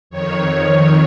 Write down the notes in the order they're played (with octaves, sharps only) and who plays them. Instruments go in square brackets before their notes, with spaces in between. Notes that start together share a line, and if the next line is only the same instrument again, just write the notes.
[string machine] F2 D#3 C#5